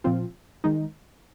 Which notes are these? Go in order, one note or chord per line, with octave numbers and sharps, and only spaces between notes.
A#2 F3 C4 F4
D#3 G#3 D#4